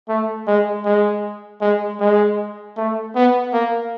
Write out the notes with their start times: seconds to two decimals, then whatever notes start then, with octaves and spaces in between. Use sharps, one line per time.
0.08 A3
0.47 G#3
0.85 G#3
1.61 G#3
2.00 G#3
2.77 A3
3.15 B3
3.53 A#3